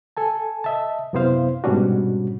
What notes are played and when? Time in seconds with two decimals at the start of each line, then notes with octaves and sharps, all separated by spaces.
0.17 A4 G#5 A5
0.64 D#5 E5 A5
1.13 F#2 C3 B3 E4 C5 F5
1.64 G#2 B2 G3 C#4 D4 F#4